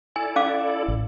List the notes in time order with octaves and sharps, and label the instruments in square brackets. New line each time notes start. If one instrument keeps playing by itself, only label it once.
[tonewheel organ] E4 A4 D5 [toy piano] G#5
[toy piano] C#4 F5 D6
[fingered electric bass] A1